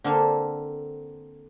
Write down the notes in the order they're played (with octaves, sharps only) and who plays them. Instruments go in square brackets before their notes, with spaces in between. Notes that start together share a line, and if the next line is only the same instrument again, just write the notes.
[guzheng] D3 A#3 C4 A4 F5 C6